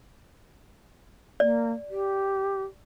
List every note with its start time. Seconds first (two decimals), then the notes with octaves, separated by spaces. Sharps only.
1.40 A#3 D5
1.90 G4